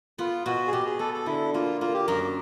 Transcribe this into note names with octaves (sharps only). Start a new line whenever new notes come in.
B3 F4
B2 F#4
G#4
B2 G4
G#4
B3 A4
A4
D3 E4
A#3 F4
A#3 F4
G4
F#2 A#4